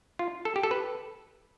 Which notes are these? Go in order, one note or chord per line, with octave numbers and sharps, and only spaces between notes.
F4
A4
G4
A4
B4